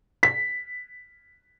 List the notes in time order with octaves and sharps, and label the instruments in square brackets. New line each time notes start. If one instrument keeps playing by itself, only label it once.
[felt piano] B6